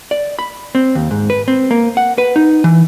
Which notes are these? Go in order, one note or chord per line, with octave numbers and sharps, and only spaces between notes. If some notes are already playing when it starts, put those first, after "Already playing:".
D5
B5
C4
D#2
G#2
B4
C4
A#3
F#5
B4
D#4
E3